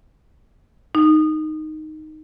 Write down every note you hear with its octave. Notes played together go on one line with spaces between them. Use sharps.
D#4